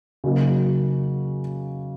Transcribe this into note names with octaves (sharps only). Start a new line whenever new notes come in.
C#3 F#3 A#3 D#4 F#4